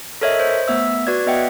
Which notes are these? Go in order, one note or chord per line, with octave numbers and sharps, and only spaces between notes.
A4 A#4 C#5 D#5 E5
C5
A3 B3 E5 E6
F#4 B4 D5 G#6
B3 D#5 E5 F#5 G5